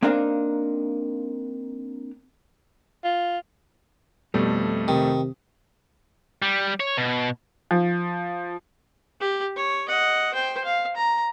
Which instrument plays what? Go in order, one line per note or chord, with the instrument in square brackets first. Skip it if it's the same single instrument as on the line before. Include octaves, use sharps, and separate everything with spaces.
[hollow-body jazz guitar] A#3 C4 D4 D#4 A#4 F5
[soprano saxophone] F4
[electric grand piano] F2 A3 [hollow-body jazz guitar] B2 G3
[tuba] C3 [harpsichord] D#3
[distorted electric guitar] G3
C#5
B2
[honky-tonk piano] F3
[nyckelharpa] G4
C#5
D#5 F#5
C5 G5
F5
A#5